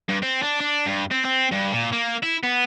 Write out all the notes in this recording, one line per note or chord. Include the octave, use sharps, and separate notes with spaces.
G2
C4
D4
D4
G2
C4
C4
G2
A#2
A#3
E4
B3